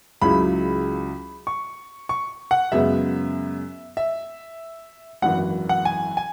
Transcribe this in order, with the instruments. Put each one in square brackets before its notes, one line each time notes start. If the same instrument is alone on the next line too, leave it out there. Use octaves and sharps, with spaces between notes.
[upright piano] C#2 C#3 F#3 E4 [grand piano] B5
[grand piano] C#6
C#6
F#5
[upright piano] F#2 C#3 G#3 B3 [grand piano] E5
[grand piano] E5
[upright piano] G#1 F#2 E3 [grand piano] F#5
[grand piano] F#5
G#5
G#5